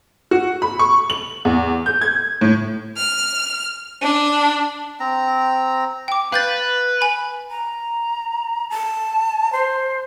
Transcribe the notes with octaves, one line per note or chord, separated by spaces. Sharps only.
F#4
B5
C#6
F#7
E2
G6
G#6
A2
F6
D4
C4 A#5
G5 D6
B4 F5 G6 A6
G#5 B5
A#5
A5
C5